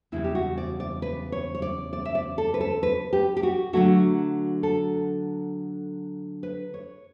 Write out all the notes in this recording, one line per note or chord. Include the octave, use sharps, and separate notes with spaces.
E2 C#3 G3 E4
G4
F#4
D5
D5
B4
C#5
C#5
D5
D5
E5
D5
A4
B4
A4
B4
G4
G4
F#4
D3 F#3 A3 F#4
A4
B4
C#5